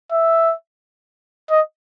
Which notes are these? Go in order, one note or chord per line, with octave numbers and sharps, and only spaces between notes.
E5
D#5